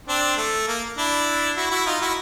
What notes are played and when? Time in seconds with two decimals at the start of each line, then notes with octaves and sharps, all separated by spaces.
0.08 C4 D4
0.37 A3
0.68 A#3
0.96 D4 E4
1.56 E4 F#4
1.71 E4 F#4
1.86 D#4 F4
2.01 E4 F#4